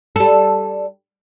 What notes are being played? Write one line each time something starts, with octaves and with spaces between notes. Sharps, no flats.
G3 A4